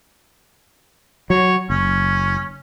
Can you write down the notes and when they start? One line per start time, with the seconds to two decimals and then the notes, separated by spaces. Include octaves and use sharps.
1.30 F#3 C#5
1.70 F#1 C#4